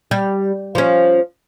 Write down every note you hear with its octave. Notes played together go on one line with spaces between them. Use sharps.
G3
F3 C#4